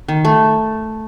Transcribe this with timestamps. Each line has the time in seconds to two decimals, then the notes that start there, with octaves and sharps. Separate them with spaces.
0.08 D#3
0.25 A3